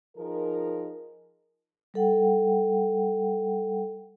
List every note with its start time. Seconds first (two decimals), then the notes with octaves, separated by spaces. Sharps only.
0.17 F3 D#4 G#4 A#4
1.94 G3 A4 F#5 G5